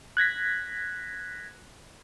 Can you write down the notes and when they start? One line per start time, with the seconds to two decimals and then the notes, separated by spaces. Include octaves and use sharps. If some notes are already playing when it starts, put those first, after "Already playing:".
0.17 F#6 G#6 A#6 B6